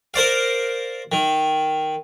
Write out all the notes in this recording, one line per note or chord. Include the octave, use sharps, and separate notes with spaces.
A#4 C5 D5 F5
D#3